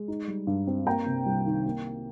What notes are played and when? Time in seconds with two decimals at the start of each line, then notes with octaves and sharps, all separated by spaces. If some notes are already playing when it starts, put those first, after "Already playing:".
Already playing: G#3
0.08 D#4
0.28 G3
0.47 G2
0.67 C4
0.86 A#3 G5 A#5
1.06 C3
1.26 C2
1.46 D#3
1.65 A#3